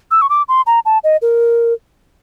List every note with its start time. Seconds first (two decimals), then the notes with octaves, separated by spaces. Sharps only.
0.11 E6
0.22 C#6
0.29 D6
0.49 C6
0.66 A#5
0.85 A5
1.04 D#5
1.22 A#4